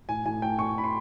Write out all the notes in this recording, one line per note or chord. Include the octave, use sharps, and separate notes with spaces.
A2 G#5
A2 G#5
A3 G5
A2 C#6
A3 B5
C6